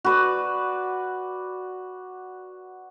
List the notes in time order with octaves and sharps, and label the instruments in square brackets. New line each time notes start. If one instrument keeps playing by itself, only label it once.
[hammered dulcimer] F#4 B4 D5